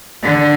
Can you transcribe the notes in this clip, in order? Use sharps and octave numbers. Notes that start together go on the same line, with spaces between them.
D3